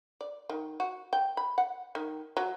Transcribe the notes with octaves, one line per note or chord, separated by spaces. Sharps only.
D5
D#3
F#4
G5
B5
F#5
D#3
F#3